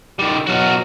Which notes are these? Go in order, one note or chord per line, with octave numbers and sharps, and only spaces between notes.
D#3 G3
B2 F#3 F#4 F5